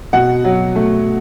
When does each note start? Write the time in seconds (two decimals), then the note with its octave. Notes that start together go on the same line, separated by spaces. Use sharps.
0.13 B2 F#5
0.44 F#3
0.76 A3